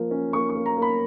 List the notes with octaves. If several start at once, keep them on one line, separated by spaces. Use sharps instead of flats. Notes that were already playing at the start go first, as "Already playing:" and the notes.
Already playing: F3 A#3
C#4
A#3 C#6
C#6
A#3
A#5
A#3
B5